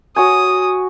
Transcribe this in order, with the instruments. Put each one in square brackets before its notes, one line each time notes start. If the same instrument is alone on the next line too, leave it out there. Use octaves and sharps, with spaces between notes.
[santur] F#4 C#5 G#5 [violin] D#6